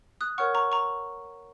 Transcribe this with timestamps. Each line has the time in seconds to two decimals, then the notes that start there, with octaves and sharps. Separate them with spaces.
0.21 D#6 F#6
0.38 A#4 C#5 F#5 C#6 F6
0.55 A#5 C#6
0.72 A#5 C#6